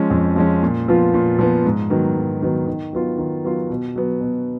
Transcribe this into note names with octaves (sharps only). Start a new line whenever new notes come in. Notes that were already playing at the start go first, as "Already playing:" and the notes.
Already playing: F3 G#3 C#4
F2
F3 G#3 C#4
A#2
F3 B3 F4
A#2
F3 B3 F4
G#2
D#3 F#3 B3
G#2
D#3 F#3 B3
D#3
F#3 B3 F4
D#3
F#3 B3 F4
B2
F#3 B3
B2